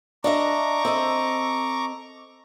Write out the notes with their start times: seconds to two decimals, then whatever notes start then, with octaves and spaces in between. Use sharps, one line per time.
0.24 D4 D#5 E5 A#5 C#6 D6
0.85 C4 A4 D#5